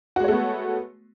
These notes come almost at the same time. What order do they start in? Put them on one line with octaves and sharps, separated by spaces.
F#4 G#3 C#5 A3 B3